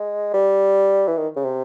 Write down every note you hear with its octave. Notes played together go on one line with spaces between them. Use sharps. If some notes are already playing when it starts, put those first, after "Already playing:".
Already playing: G#3
G3
E3
D#3
C#3
C3